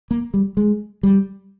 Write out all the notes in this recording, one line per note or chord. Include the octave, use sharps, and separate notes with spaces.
A#3
G3
G#3
G3